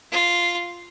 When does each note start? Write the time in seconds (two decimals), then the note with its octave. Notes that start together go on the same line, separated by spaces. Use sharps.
0.12 F4